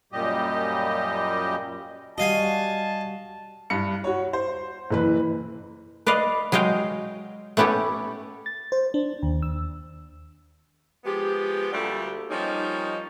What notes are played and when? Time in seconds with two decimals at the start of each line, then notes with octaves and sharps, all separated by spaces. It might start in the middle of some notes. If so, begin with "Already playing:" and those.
0.13 F#2 A#2 G3 G4 D#5
2.18 G3 F#4 D#5 F5 G#5 A5
3.70 G2 C#7
4.04 F#4 C#5
4.33 C5
4.91 F#1 E3 B4
6.06 B4 D5 D#5 F5
6.52 F#3 G#3 D#5 F5 G5
7.57 A3 B3 C#4 G4 A4
8.46 A6
8.72 C5
8.94 D4
9.23 D#2
9.42 E6
11.05 F3 G#3 B3 G4
11.73 D2 A#2 D3 G3 A3 G4
12.30 F3 G3 A#3 C#4 D#4